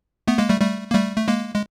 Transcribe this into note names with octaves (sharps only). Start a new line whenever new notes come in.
A3 B3
G#3 A#3
G3 A3
G3 A3
A#3
G3 A3
A3
G#3 A#3
G#3